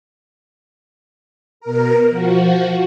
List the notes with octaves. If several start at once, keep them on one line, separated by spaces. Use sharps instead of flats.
B2 A#4
F3 F#4